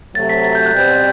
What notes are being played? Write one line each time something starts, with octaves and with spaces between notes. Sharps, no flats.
C3 F#3 A3 A6
B6
A6
G6
F#6
B2 G3 C4 G6